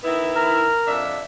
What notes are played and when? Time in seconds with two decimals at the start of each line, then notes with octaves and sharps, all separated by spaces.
0.04 D#3 B3 E4
0.35 A#4
0.87 F2 D4 E5